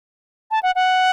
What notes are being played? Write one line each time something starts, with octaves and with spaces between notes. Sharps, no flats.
A5
F#5
F#5